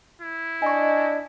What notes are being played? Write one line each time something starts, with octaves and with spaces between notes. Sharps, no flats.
E4
D4 D#5 G#5 C#6